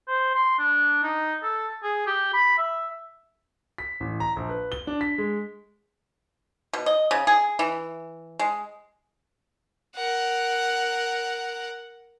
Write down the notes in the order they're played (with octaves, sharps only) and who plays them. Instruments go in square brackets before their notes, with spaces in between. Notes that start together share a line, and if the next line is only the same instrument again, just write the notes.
[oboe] C5
C6
D4
D#4
A4
G#4
G4
B5
E5
[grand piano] B6
A1
A#5
A#1
B4
G7
D4
B6
G#3
[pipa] B2
D#5
C#3
G#4
E3
G#3
[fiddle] A#4 F#5